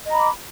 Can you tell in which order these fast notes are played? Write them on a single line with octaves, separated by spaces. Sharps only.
D#5 A#5 B5 D6